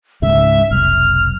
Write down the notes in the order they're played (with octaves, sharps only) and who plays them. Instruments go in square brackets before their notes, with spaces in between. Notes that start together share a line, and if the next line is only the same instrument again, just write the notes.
[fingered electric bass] C#2 G#2 C#3 [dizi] E5
[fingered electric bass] F1 B1 [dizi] F6